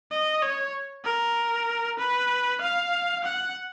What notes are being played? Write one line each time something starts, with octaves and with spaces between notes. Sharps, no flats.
D#5
C#5
A#4
B4
F5
F#5